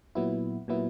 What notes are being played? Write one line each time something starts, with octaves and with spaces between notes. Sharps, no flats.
A#2 F#3 B3 E4
A#2 F#3 B3 E4